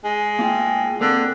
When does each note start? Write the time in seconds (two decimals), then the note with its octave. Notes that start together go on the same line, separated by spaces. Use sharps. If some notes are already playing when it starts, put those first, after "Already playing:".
0.04 G#3
0.39 A#3 F4 G5
1.01 D3 A#3 C4